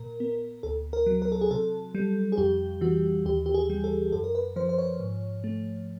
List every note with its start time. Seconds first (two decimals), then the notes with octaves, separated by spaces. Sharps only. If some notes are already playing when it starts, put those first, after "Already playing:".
Already playing: A#2 A#4
0.20 B3
0.63 D2 A4
0.93 A#4
1.06 F#3
1.22 A#4
1.32 A4
1.41 G#4
1.51 C3 A4
1.95 G3
2.32 G#4
2.38 F2 G4
2.81 E3 F#4
3.25 D#2 G4
3.46 G4
3.54 G#4
3.70 G3
3.84 A4
4.12 F#2 A4
4.24 A#4
4.35 B4
4.56 F3 C5
4.69 C5
4.78 C#5
5.00 G#2
5.44 A3